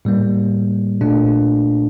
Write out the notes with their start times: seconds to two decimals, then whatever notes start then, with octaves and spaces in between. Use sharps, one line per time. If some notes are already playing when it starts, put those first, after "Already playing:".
0.05 A2 G3 A#3
1.01 A#2 A3 D4